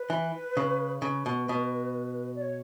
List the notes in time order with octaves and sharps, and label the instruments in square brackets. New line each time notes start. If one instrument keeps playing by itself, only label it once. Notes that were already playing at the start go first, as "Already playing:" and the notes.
Already playing: [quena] B4
[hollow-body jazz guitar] E3
C#3
[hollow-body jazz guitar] C#3 [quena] B4
[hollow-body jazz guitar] B2
B2
[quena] D5
C#5